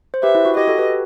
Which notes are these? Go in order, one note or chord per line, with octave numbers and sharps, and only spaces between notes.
C5
G4 B4 E5
E4
F#4
G4 D#5
F#4 A4
G4 B4